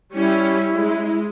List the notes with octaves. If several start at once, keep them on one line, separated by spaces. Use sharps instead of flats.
G3 C#4 E4 G4
G#3